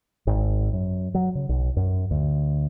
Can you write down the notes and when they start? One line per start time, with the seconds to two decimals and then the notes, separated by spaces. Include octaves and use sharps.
0.27 G#1
0.73 F#2
1.15 F#3
1.35 C#3
1.49 B1
1.77 F#2
2.11 D2